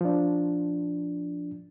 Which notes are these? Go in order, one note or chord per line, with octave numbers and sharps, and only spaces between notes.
F3 D4